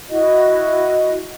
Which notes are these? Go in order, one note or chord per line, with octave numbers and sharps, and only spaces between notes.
E4 F#4 D#5